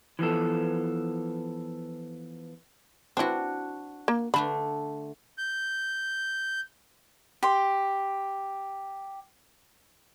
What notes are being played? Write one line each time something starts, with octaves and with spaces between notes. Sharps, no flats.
E3 F3 B3 A4
C4 D4 E4 F#4
A#3
D3 A3 D4 B5
G6
G4 C6